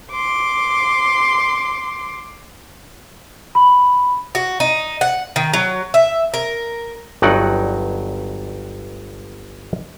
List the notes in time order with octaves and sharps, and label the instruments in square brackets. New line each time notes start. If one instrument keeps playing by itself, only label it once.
[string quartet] C6 D6
[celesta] B5
[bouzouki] F#4
D#4
F#5
D#3
F#3
E5
A#4
[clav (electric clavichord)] G1 G2 F#3 D#4 D5 F#5